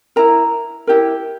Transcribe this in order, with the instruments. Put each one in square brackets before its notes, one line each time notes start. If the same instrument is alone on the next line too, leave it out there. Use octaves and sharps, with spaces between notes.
[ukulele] E4 A#4 A#5
E4 G4 A#4